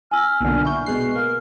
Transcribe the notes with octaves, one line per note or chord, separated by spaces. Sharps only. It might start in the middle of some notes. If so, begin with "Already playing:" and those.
G#5 E6 F6
B1 A#2 D3
E4 C#6 G6
B2 G#3 F#6 C7
A#3 F6